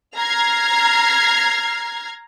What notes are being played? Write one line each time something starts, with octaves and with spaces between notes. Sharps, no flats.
A#5 F6 G#6 C7